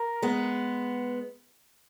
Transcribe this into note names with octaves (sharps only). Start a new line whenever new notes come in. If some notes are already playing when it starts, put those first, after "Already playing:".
Already playing: A#4
G#3 B3